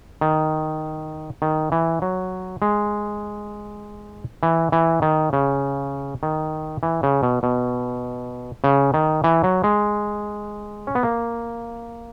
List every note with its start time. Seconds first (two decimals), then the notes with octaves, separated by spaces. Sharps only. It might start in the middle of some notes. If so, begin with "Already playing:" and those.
0.21 D#3
1.42 D#3
1.72 E3
2.02 F#3
2.62 G#3
4.43 E3
4.72 E3
5.02 D#3
5.33 C#3
6.23 D#3
6.83 E3
7.03 C#3
7.23 B2
7.43 B2
8.64 C#3
8.94 D#3
9.24 E3
9.44 F#3
9.64 G#3
10.87 C#4
10.95 B3
11.03 A#3